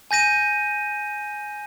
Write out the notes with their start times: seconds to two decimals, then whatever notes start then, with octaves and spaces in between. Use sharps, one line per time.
0.11 G#5 G6 A#6 D#7